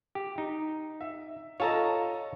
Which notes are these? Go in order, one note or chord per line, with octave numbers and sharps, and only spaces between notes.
G4
D#4
E5
F4 A4 C#5 D#5 A5 A#5